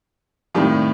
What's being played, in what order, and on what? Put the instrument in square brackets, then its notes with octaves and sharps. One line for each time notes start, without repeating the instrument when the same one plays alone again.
[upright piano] F2 A2 D#3 [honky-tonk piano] F3 G3